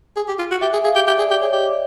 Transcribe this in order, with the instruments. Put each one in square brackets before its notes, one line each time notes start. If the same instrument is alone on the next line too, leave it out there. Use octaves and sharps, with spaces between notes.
[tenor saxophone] G#4
G4
F4
F#4
[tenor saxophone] G4 [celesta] E5
[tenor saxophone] G#4
[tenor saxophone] G#4 [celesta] F5
[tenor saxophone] G4
[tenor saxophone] G4 [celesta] E5
[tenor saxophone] G#4 [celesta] D5
[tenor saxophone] G4 [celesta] D5
[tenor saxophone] G#4 [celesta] C#5
[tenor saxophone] G4 [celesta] D#5
[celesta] D5